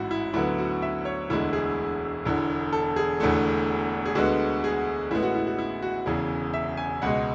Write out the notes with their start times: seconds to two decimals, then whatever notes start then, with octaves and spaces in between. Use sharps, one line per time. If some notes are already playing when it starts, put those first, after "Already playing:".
Already playing: A1 G#2 E4 F#4
0.11 E4
0.33 D2 D3 F#3 B3 E4
0.58 F#4
0.82 E5
1.05 C#5
1.30 E1 D2 D3 G#3 E4
1.53 G#4
2.25 E1 E2 D3
2.73 A4
2.96 G#4
3.20 E1 E2 D3 A3
4.06 G#4
4.15 D2 D3 G#3 B3 F#4
4.64 G#4
5.11 A1 A2 G#3 B3 E4
5.23 F#4
5.35 E4
5.47 F#4
5.59 E4
5.82 F#4
6.06 E1 E2 C#3 G#4
6.54 E5
6.77 G#5
7.02 C#2 B2 G#3 F#5